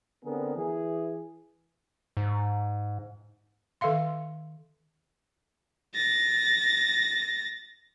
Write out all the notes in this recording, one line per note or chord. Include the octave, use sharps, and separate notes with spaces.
D3 B3 C4 G#4 A#4
E3 G#4
G#2
D#3 A4 E5 F5 C6
A6 A#6